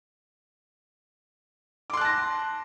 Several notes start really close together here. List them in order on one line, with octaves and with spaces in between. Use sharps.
D6 C6 F#6 A5 A#6